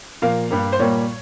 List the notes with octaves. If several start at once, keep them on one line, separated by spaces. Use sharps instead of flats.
A#2 F3 A#3 F5
G2 G3 A#3
C5
A#2 G3 A#3 C#5